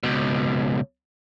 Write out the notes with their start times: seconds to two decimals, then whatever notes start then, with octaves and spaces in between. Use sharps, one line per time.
0.03 C#2 B2